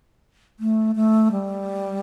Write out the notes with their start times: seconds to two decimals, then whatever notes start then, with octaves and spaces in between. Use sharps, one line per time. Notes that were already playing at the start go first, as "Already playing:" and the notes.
0.60 A3
0.95 A3
1.32 G3